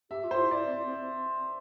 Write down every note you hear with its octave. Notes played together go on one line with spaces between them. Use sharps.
G4 E5
F4
C5
E4
E4 D5
C4
C4